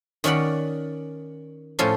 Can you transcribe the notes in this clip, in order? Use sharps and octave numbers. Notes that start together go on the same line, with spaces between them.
D#3 C#4 D5 F#5 B5
A2 F3 C#4 A4 C6